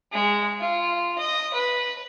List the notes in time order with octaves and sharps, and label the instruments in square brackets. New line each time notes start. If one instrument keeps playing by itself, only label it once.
[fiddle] G#3
F4
D#5
B4